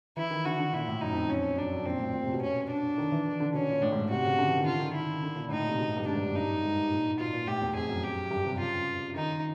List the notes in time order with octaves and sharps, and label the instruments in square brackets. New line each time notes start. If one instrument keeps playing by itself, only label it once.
[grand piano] E3 [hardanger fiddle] E4
[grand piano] D#3
[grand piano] D3 [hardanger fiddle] F#4
[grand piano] D3
[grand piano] A#2 [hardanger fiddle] E4
[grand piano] A2
[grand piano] F#2 [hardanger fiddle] D#4
[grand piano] F2
[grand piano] F2 [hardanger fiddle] C#4
[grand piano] F#2 [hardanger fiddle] D4
[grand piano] F#2
[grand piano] A#2 [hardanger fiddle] C4
[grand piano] A2
A#2
C3
B2
[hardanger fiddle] C#4
D4
[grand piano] D#3
E3
D#3
D3
[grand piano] B2 [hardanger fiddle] C#4
[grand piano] A#2
[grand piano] A2 [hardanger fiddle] D4
[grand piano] G#2
A2
[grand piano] C3 [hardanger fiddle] F#4
[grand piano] C#3
D3
E3
D#3
[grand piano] D3 [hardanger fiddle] F4
[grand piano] D#3
[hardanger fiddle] E4
[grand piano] D3
A#2
[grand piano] A2 [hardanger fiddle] D#4
[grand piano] A#2
C3
B2
A2
G2
[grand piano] G#2 [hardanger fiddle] D4
[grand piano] G2
F#2
[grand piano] G2 [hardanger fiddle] D#4
[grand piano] G#2
A#2
[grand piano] B2 [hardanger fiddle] F4
[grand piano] A#2
[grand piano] A2 [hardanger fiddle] G4
[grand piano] E2
[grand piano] F2 [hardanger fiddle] G#4
[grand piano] F#2
[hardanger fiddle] G4
[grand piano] G2
C3
[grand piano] C#3 [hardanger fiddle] F4
[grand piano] D#3 [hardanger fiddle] D#4